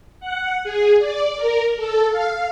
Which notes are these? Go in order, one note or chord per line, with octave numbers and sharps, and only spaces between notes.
F#5
G#4
D5
A#4
A4
F5